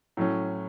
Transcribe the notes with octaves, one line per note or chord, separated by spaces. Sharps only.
A2 F#3 C#4